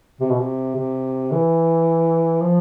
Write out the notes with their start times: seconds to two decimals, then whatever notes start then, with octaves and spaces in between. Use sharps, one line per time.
0.21 C3
0.31 B2
0.40 C3
0.76 C3
1.32 E3
2.42 F3